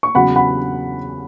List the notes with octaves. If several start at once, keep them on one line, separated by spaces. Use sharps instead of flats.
C#6
E2 C#3 F#3 F#5 B5
F#5 B5